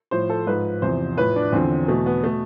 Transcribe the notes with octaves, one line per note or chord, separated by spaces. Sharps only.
A2 F3 C5
A4
G#2 F3 B4
E2 C3 F3 C5
A2 F3 B4
D4
E2 D3 F3 C4
E2 B2 A3
B3
B2 A3